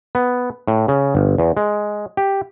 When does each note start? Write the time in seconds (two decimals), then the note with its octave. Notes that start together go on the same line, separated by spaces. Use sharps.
0.15 B3
0.68 A2
0.88 C#3
1.15 G1
1.38 E2
1.57 G#3
2.17 G4